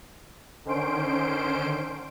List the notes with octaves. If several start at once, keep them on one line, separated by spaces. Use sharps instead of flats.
D3 D#3 C#4 C5 C6 D7